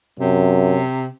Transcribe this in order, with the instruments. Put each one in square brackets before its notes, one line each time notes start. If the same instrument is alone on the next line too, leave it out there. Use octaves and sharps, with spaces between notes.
[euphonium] F#2 [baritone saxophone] C3